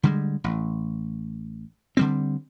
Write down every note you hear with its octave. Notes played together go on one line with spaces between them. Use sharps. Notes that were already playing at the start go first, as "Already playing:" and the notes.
D3 G3 G#3
A1
D3 G3 C4